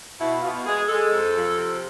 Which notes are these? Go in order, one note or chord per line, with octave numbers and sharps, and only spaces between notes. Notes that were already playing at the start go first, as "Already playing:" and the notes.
B2 E4
B2 F4
G#3 G#4
G#3 A4
F2
F3
C3